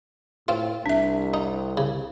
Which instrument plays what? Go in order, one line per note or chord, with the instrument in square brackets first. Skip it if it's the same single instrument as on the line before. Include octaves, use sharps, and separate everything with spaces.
[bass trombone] A2 [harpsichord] C4 F4
[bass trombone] C2 [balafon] D4 E5
[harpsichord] D#4
C#3